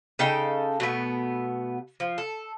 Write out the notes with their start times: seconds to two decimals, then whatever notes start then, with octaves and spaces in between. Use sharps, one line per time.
0.19 C#3 D#4 A4 G5
0.80 B2 A3 B3
2.00 F3
2.18 A4